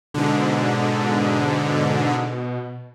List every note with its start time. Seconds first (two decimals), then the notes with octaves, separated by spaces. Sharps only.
0.14 G#2 B2 D3